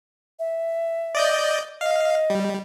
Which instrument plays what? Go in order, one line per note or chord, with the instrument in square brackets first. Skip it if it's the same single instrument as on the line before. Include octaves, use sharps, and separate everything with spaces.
[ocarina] E5
[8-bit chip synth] D5 D#5 G6
[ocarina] D#5 [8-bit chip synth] F5
[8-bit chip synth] G3